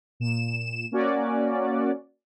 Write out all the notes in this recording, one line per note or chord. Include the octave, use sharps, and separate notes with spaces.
A#2 E7
A#3 C#4 F#4 D5